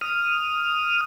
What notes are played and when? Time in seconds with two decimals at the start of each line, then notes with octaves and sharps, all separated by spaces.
0.01 D#6 F6